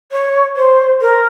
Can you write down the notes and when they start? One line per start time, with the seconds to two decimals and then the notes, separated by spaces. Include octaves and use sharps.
0.12 C#5
0.56 C5
1.01 A#4